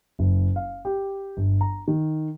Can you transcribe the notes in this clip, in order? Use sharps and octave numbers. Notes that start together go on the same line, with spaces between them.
F#1
F5
G4
G1
A#5
D#3